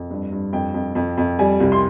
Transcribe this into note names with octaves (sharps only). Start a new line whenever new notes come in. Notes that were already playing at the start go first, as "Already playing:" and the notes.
Already playing: F2
G2
G2
F2 G5
F2
F2
F2
G3 G#5
C2
C6